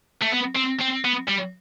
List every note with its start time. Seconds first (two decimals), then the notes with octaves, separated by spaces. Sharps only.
0.22 A3
0.32 B3
0.55 C4
0.80 C4
1.05 B3
1.29 G3